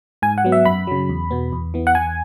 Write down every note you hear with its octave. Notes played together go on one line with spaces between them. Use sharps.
G#2 G#5
F#5
F#3 B3
E5
F#2 B5
C#3 F#3
E2
B2 B3
E2
E3 B3
F#5
E2 G#5